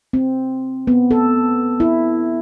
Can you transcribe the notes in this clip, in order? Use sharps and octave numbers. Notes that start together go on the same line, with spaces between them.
C4
B3
A4
E4